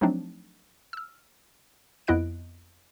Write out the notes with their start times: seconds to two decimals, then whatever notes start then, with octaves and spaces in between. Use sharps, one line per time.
0.01 F3 F#3 A3 C4 D4 D#4
0.93 E6 F6
2.07 F2 B3 E4 D#5 F#6 D7